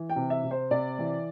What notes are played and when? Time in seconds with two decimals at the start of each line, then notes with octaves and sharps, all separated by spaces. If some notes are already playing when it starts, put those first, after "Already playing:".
Already playing: E3
0.10 G5
0.16 C3
0.30 E5
0.44 C3
0.51 C5
0.71 C3 D5
0.99 E3